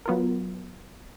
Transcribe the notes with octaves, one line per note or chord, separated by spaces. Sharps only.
F#3 B3 F4 A#4